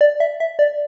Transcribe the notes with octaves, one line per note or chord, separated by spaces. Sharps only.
D5
E5
E5
D5